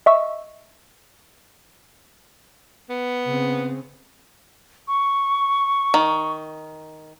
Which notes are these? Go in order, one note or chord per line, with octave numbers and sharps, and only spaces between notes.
D#5 E5 C#6 E6
B3
C#3 C4
C#6
D#3